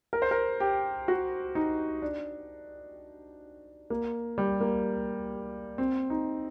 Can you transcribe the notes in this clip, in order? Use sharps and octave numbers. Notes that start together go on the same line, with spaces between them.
A#4
C5
A#4
G4
F#4
D#4
D4
A#3
G3
A#3
C4
D#4